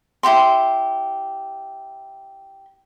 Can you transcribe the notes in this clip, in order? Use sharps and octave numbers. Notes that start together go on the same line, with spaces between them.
E4 F#4 G4 C6